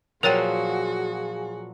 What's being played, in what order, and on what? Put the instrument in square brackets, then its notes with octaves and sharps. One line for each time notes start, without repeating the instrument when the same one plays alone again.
[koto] A#2 F3 F#3 [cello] F#4 [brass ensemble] G#4 [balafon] A#4 C#5 G5